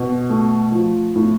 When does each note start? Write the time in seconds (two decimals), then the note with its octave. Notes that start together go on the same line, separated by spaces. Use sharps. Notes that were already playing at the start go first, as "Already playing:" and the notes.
Already playing: B2
0.30 A3
0.72 F3
1.16 A2